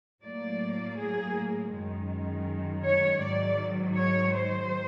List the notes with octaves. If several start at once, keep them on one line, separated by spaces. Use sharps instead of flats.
A2 F#3 A#3 D5
G#4
F#2 D#3 G#3
C#5
G#2 D#3 F#3 D5
C#5
C5